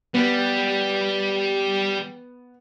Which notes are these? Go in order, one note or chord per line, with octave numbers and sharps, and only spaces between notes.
G3 B3